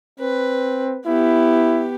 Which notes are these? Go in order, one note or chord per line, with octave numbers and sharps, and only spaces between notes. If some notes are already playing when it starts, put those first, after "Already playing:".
C4 B4
B3 E4 G4